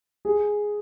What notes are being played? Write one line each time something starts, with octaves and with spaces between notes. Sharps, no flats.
G#4